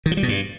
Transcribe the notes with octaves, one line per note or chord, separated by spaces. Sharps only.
D#3
F3
G3
B2
G2